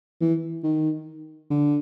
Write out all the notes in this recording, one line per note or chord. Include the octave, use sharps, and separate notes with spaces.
E3
D#3
D3